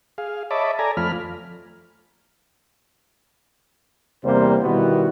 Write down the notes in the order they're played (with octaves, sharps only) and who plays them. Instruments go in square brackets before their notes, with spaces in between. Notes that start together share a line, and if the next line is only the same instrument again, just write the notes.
[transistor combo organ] G#4 F5
C#5 D#5 E5 A5 B5 D6
A4 D5 G#5 A#5
F2 F3 A3 B5 F6
[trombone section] E2 C3 G3 A#3 C5
B2 D#3 G3 B3 E4 F#4